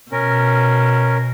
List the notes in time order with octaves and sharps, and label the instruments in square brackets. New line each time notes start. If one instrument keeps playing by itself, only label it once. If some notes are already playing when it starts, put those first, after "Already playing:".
[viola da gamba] B2 [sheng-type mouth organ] C#4 A#4